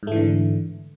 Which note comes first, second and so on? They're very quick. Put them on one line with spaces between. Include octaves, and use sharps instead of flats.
G#2 A3 E3 D3